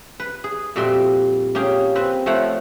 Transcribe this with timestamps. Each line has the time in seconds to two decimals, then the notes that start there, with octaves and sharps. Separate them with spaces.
0.20 B4
0.44 G#4
0.76 F2 A#2 G3 F#4 E5 C6
1.55 A#3 C#4 G4 G#4
1.95 C4 B4
2.26 F3 A3 C#5 F#5 B5